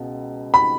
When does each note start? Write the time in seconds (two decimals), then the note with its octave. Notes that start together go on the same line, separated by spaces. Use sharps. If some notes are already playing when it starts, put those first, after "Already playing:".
Already playing: C#2 B2
0.54 B5